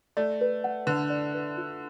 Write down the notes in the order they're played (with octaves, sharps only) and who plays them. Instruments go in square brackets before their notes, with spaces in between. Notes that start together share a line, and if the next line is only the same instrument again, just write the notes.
[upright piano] A3 [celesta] D5
[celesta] B4
F#5
[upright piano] D3 [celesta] B4
[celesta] D5
B4
F4